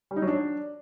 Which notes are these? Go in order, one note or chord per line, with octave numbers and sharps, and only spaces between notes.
G3
D#4
F#3
D4